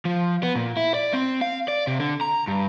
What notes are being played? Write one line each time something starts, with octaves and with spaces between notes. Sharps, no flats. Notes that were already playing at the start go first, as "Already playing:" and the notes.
F3
B3
A#2
E4
D5
C4
F5
D5
C3
D3
A#5
G2